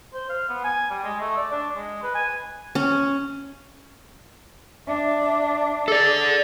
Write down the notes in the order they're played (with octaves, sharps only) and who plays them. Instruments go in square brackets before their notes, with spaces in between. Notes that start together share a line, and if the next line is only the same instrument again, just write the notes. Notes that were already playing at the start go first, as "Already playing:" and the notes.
[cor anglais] C5
F5
B3
G#5
G3
G#3
A3
D5
D4
G#3
B4
G#5
[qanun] C#4
[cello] D4 [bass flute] E5
[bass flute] G#4 [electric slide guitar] A4 D5